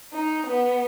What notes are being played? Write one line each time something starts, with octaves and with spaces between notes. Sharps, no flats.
D#4
B3